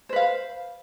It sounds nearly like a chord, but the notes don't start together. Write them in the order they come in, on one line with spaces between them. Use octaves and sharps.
C5 B4 F5